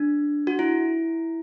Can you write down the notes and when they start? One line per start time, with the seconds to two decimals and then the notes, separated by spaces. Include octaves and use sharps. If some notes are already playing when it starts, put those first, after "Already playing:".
Already playing: D4
0.47 F#4
0.59 E4